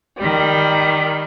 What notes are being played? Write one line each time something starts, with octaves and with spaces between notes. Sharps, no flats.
D#3 G3